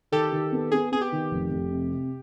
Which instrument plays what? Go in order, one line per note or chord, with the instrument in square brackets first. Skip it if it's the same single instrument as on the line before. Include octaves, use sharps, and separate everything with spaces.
[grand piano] D#3 [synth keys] G4 A4
[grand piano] D#3
B3
[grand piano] B3 [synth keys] G#4
[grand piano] B3 [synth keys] G#4
[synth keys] G4
[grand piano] D#3
F1
F1
C3
C3